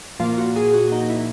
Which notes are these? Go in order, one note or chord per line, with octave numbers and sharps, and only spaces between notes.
A#2 F3 A#3 F4
F#4
G#4
F#4
D#4
E4